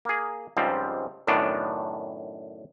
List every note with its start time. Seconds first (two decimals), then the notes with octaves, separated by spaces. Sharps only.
0.05 A#3 G#4
0.57 C#2 G#2 F3 G3 C4
1.27 F#2 A2 D#3 B3 D4